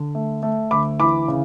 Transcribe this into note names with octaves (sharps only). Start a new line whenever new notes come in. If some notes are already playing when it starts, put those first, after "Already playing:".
Already playing: D3
A3
A3
D2 B5 D6
E3 B5 D6
C#3